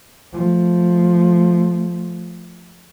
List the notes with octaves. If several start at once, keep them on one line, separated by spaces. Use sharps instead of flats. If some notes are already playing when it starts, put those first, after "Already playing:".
F3 A3